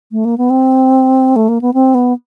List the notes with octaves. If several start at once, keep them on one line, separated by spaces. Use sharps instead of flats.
A3
A#3
B3
C4
A3
A#3
B3
C4
B3